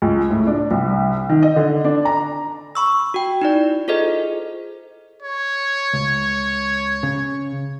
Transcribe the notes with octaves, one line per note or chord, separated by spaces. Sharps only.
C#2
A2
D4
C2
D#3
D#5
D3
D4
A#5
B5 C#6 E6
F#4 G5
D#4 E4 D5
F4 G#4 A4 C5 D#5
C#5
C#2
C#3